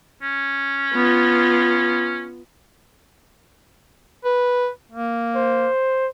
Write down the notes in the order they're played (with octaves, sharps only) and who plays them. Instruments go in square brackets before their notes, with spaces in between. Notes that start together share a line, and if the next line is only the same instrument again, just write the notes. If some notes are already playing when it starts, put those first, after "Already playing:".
[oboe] C#4
[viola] B3 F4
[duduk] B4
A#3
[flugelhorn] C5